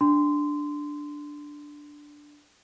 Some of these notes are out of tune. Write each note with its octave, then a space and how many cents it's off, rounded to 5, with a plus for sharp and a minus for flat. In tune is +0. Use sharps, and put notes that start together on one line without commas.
D4 +0 C6 -20